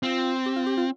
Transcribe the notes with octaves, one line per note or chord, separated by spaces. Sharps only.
C4 F4
G4
F4
G4
F4